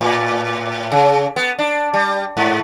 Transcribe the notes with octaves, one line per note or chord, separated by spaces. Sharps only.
A2
C#3
B3
D4
G3
G#2